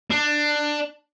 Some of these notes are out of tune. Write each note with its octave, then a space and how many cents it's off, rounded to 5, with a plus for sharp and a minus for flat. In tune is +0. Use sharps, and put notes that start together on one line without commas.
D4 +15